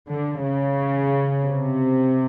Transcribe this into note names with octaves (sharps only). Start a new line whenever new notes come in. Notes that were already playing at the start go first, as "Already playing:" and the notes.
D3
C#3
C3